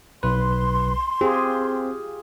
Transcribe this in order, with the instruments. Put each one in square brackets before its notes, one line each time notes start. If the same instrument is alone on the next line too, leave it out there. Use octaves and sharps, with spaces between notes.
[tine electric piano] B1 B4 [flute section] C6
[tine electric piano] C4 [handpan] F4 G4 G#4